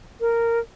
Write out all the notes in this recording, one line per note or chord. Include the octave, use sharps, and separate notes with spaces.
A#4